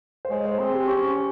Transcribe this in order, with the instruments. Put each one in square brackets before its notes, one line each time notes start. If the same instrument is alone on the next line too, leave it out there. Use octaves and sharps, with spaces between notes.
[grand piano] C5
[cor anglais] G#3 [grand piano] C#5
[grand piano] C5
[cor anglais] C4 [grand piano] G#4
[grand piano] G4
[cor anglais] C#4 [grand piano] G4